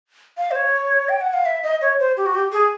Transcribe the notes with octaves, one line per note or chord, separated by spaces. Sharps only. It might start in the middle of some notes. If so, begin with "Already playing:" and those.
F5
C5
C#5
G5
F#5
F5
E5
D#5
C#5
C5
G4
F#4
G4
G#4